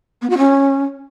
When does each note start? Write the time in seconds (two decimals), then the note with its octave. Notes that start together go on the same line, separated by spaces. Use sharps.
0.22 B3
0.30 F#4
0.38 C#4